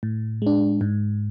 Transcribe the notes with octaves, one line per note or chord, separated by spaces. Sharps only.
A2
G#3 D4
G#2